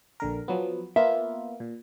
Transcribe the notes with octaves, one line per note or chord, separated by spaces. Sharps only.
A#1 D3 A#4
F3 F#3 B3
A#3 B3 F4 E5
A#2